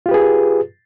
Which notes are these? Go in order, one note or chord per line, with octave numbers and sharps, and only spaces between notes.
F4 G4 G#4 B4